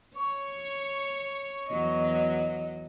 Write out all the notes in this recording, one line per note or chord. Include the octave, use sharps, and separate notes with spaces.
C#5 C#6
E2 F#3 D#5